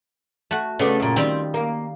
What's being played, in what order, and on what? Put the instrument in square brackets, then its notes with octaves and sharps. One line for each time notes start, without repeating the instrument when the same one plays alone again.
[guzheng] A3 F#4
[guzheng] C#3 [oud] A3 B3 D4
[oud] F#2 A#2
[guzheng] D#3 G3 F4 [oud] C4
[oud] A#3